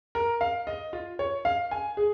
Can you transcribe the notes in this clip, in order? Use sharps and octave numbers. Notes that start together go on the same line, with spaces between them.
A#4
F5
D#5
F4
C#5
F5
G#5
G#4